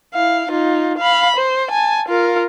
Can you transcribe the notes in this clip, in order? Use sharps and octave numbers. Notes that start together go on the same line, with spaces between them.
E4 F5
D#4 F4
F5 B5
C5
G#5 A5
F4 A#4